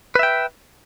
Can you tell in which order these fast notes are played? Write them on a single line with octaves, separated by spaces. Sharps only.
B4 E5 G5